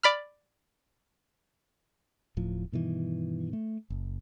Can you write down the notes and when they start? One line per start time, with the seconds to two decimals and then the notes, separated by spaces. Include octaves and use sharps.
0.03 D5 B5 F6
2.37 D1 A2 F3
2.72 G2 B2 D#3 E3
3.53 A3
3.90 F#1